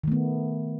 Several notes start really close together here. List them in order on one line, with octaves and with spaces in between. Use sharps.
D#3 A3 B3